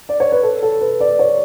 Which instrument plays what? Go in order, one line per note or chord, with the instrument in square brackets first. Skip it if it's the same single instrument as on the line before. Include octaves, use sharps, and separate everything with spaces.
[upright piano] D5
C#5
B4
A4
A4
B4
D5
C#5